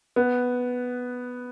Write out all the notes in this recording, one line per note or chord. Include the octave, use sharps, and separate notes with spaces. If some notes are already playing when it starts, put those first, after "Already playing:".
B3